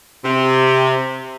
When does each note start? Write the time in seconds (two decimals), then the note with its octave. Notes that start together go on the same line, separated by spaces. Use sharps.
0.25 C3